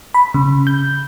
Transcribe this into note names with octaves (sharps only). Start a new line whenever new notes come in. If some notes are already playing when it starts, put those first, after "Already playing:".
B5
C#3
G6